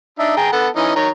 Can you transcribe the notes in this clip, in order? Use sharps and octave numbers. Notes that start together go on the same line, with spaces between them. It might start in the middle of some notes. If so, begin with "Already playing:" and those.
D4 D#4 E5
G#4 G5 A#5
B3 A4 F#5
E3 C#4 D#4
D#3 C#5 A#5